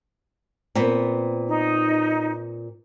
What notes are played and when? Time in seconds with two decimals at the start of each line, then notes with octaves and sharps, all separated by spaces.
0.75 A#2 B3 C4
1.47 D#4